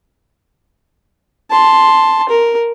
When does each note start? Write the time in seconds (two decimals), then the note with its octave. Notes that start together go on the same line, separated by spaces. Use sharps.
1.51 A5 C6
2.29 A#4